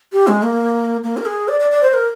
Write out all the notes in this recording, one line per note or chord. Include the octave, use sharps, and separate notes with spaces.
G4
G#3
A#3
A#3
A#4
G#4
D5
D5
D5
C5
A#4